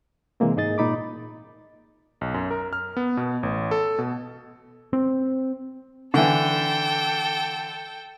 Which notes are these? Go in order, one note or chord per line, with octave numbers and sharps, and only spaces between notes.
C3 E3 G#3 A#3 C4
G#2 D#4 G#4 D#5 A6
A#2 D#4 B5 D6
B1
F#2
A#4
F6
B3
B2
A1
A4
B2
C4
D3 E3 A4 G5